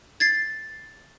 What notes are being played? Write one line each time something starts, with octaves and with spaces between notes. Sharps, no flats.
G#6 A6 C7